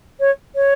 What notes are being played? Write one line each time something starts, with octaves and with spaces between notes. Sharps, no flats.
C#5
C#5